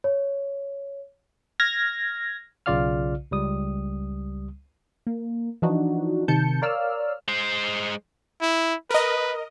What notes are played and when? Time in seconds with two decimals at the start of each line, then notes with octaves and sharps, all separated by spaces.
0.04 C#5
1.60 F6 G#6 A#6
2.66 B1 C#3 F4 D5 F5 F6
3.31 C#2 G3 D#6
5.07 A#3
5.62 E3 F3 D4 D#4 F#4
6.28 C3 D#3 A5 G6 C#7
6.62 A#4 C#5 D5 F5 E6 F6
7.28 G#3 C5
8.41 E4
8.91 A#4 B4 D#5